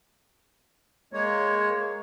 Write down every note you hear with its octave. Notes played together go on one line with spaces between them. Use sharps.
G#3 A#3 C#5